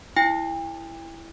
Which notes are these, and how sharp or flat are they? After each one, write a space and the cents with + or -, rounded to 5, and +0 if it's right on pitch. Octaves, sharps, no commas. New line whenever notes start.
E4 +10 G5 +40